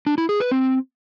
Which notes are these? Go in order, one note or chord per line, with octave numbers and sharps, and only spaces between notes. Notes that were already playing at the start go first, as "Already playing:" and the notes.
D4
E4
G#4
B4
C4